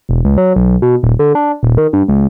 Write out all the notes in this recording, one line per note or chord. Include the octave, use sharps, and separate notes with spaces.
E1
C#2
F#3
B1
B2
D#1
D3
D4
D#1
D#3
G2
C#2